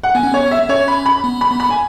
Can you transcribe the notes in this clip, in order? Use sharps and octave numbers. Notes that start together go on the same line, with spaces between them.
F#5
B3 G#5
C#4
B3 C#5
E5
C#4 C#5
B5
B5
B3
B5
B3
B5
G#5